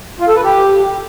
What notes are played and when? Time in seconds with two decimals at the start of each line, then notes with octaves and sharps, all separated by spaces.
0.20 F4
0.28 A4
0.36 B4
0.44 G4